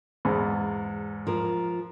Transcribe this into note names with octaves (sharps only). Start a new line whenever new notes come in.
E2 G#2
F3 A#4